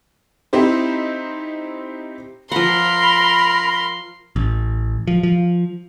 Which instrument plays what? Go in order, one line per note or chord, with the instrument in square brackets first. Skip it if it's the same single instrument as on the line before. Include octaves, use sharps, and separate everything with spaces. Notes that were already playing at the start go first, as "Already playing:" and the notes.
[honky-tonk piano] C4 D#4 E4 G4 C5
[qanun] F3 F#5 [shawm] A#4 [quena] B5 [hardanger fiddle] C6
[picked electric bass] A1
F3
F3